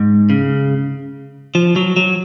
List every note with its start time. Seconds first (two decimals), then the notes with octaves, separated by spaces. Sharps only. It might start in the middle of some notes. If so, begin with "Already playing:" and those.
Already playing: G#2
0.30 C#3
1.55 F3
1.76 F#3
1.97 F#3